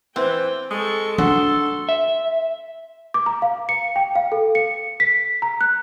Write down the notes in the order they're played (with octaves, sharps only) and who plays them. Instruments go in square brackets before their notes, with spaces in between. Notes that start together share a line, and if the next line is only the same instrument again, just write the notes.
[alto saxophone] E3 [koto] C4 [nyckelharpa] G5
[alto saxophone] G#3 [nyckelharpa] A4 C#6
[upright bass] D4 [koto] F#4 [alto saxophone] A4 [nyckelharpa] C6
[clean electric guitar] E5
[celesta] D6
A#5
F5
C#7
G5
F5
A4
C#7
B6
A#5
F#6